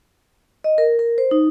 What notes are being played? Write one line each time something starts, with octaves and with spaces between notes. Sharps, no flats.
D#5
A#4
A#4
C5
D#4